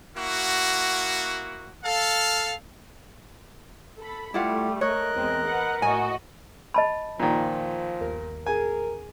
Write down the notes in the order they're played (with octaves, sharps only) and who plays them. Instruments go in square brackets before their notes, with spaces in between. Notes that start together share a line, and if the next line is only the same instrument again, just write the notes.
[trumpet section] A#3 E4 F#4
A4 F5
[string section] A4 B5
[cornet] G3 [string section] A3 [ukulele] E4 F4 F#5 [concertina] G4
[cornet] A#4 [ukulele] C#5 [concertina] D#5 F#6
[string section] E2 G#3 C4
B4 F#5
[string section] A2 F#4 D#5 [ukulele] G#5
[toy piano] D#5 A5 B5
[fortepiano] A#2 D#3 [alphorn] F3
[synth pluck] G1 D#2 A#4
[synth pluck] A1 G#4 [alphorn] A#4 [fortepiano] G#5